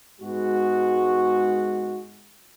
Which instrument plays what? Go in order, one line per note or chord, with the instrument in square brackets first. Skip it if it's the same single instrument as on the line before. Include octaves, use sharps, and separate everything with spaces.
[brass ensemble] G#2 G#3 B3 F#4